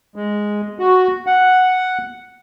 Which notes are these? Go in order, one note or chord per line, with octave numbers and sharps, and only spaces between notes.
G#3
F#4
F#5